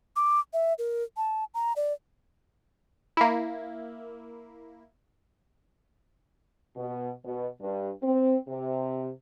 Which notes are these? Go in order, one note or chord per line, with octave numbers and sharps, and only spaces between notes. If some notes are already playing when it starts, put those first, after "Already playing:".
D6
E5
A#4
A5
A#5
D5
A#3 E4
B2
B2
G2
C4
C3